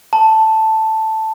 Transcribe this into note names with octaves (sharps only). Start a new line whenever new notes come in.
A5